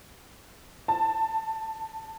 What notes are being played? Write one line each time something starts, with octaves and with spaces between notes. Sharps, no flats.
A5